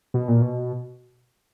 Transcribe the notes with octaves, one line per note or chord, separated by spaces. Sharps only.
B2
A#2
B2